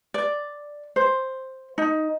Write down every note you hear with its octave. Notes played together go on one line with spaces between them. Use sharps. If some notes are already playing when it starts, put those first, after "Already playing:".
D5
C5
D#4